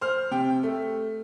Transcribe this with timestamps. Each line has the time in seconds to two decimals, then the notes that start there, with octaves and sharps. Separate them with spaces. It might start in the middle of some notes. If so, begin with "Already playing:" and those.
0.01 C5 F6
0.31 C3 G5
0.63 A3